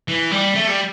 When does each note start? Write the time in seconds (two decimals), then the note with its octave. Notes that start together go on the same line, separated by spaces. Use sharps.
0.08 E3
0.32 G3
0.55 A3
0.68 G3